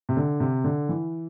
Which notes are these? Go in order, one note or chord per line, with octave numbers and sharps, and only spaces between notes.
C3
D3
C3
D3
E3